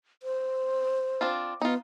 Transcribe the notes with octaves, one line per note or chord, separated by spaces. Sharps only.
C5
C4 D4 F4
B3 D#4 F4